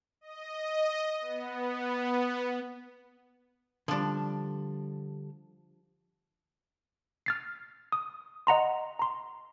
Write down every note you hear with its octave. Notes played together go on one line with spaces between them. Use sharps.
D#5
B3
D3 F3 G3 D4
F6 A6 C7
D#6
D#5 F#5 A#5 C6
A#5 C6